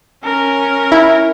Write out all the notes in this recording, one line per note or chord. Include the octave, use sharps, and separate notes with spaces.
C#4 A#4
E4